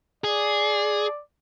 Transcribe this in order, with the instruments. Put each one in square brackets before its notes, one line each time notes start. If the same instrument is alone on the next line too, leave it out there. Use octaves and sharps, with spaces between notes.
[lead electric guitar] G#4 [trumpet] D5